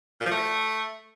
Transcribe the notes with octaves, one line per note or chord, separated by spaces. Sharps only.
A#2
F3
A3